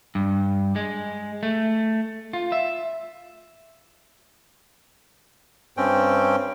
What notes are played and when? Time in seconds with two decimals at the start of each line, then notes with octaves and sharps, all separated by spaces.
0.15 G2
0.76 G#3
1.43 A3
2.33 F4
2.52 E5
5.77 G2 C4 C#4 G5